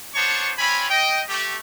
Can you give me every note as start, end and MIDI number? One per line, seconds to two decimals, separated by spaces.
0.15 0.53 59
0.15 0.53 62
0.15 0.53 72
0.15 0.53 73
0.15 0.53 81
0.15 0.53 85
0.58 0.86 60
0.58 0.86 65
0.58 0.86 73
0.58 0.86 80
0.58 0.86 83
0.90 1.21 75
0.90 1.21 79
1.29 1.57 57
1.29 1.57 67